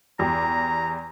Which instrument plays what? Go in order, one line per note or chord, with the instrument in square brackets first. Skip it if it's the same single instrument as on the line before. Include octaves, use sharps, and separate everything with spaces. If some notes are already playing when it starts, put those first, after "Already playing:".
[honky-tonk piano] E2 G4 [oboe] A#5